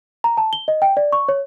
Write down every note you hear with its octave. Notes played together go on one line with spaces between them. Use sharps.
A#5
A5
G7
D#5
G5
D5
C#6
C#5